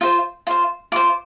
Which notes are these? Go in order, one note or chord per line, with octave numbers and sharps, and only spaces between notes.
F4 C5
F4 C5
F4 C5 D6